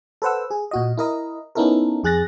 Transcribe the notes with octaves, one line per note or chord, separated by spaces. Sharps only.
A4 B4 C5 F#5 E6
G#4
A#2 F#4 D#5
E4 A#4 D#5
B3 C#4 D#4 E4 A4 A#4
F2 G#4 F#6 A6 A#6